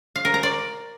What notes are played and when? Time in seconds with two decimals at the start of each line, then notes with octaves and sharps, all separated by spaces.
0.16 F5
0.25 A#4
0.34 A#5
0.43 D5